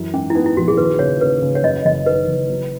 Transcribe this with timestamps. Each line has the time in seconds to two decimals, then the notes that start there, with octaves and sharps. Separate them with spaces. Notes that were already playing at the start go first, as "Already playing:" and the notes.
Already playing: F#2 E3
0.13 G#2 C#4
0.30 E4
0.35 B3 D#4
0.46 E4
0.57 A#1 F#4
0.68 G#4
0.78 D#2 B4
0.99 C#3 C#5
1.21 C#3 B4
1.42 C#3
1.55 C#5
1.64 F#2 D#5
1.85 F#1 D#5
2.06 D#3 B4
2.27 F#1
2.49 F#3